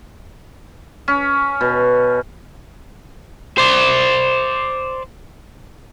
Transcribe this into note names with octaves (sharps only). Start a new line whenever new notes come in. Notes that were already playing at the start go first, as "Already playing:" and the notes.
C#4
B2
C5 D5